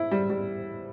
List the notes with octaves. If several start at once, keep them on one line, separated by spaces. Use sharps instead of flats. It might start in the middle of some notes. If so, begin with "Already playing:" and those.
Already playing: E4
G3
G3